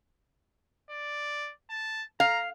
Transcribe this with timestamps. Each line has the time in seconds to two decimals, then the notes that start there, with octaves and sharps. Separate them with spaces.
0.90 D5
1.70 A5
2.20 F5 A#5